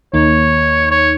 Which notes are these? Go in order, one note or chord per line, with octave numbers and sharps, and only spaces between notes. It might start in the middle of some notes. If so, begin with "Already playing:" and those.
D#2 D#3 A#3 D#4 C#5
C#5